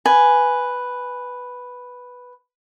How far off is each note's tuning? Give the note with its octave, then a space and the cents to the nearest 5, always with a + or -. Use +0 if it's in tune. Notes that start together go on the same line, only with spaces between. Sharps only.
B4 +0 G#5 +0